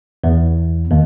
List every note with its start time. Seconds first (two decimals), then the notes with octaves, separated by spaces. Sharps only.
0.24 E2
0.91 D#2